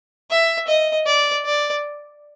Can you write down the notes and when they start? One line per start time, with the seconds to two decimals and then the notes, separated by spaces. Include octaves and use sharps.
0.31 E5
0.68 D#5
1.06 D5
1.45 D5